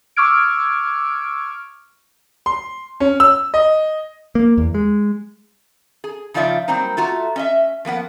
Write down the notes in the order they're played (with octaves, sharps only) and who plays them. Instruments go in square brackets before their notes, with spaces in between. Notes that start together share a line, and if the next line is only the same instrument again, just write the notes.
[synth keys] C#6 D6 E6 F6 G#6 D7
[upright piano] C6
C#4
E6
D#5
[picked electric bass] A#3
E2
G#3
[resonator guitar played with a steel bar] G#4
C#3 F3 D#4 F4 D5 E5
F#3 G3 A#3 C4 D#4
A3 F4 F#4 A#5
C#4 D#5 E5
F3 A#3 B3 F#5